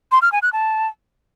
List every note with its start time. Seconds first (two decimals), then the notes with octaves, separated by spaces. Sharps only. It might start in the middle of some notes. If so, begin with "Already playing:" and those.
0.12 C6
0.22 F6
0.32 G#5
0.43 F#6
0.53 A5